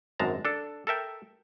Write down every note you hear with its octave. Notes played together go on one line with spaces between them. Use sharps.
G#1 F#2 G#3 A5 A#5
D4 A4
A4 A#4 E5 G5